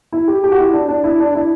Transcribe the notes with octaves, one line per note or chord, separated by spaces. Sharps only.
E4
G4
G4
F#4
E4
D4
D4
E4
D4
D4
E4